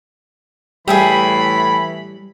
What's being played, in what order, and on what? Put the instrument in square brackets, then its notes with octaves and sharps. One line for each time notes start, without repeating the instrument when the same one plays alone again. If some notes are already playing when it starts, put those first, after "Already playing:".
[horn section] A2 E3 B5 [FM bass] G3 [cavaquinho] G#4 E5 G5